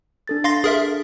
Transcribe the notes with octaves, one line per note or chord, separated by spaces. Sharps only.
D4 A4 A6
F5 C6 A#6
G#4 A#4 E5